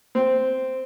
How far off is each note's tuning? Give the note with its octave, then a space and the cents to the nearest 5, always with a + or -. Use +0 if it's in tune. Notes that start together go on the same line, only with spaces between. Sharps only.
C4 -5